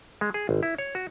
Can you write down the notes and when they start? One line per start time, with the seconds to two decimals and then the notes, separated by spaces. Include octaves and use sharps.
0.21 G#3
0.34 G#4
0.49 G#1
0.63 E4
0.78 C#5
0.95 F#4